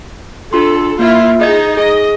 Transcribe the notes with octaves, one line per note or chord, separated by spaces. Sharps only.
D4 F4 A4 C6
A#3 E4 F4 E5
D#4 G#4 D#5 G#6
G#4 D#5